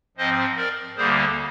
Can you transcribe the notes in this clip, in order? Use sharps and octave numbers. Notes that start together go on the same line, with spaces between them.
G#2 F3 C4 C5 D#5
A#4 D5
D2 D3 G3 A#3 G#4 C5